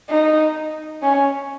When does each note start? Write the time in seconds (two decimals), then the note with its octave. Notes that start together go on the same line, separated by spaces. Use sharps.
0.09 D#4
1.02 C#4